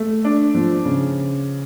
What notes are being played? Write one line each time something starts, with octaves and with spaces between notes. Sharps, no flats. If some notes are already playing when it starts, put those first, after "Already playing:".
Already playing: A3
D4
F3
C#3